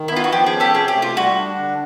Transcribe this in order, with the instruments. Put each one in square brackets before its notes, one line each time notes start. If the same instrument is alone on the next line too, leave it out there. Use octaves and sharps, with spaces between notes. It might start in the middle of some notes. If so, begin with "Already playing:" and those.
Already playing: [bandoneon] D#3
[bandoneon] B3 [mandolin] E4
[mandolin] F4
F#4
[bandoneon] F3 [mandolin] G4
[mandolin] G#4
[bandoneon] C#4
[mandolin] G4 A4
[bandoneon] C3 [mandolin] G#4
[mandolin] G4
[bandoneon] A3
[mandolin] F4
[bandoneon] G3 [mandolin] F#4
[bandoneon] D4
D3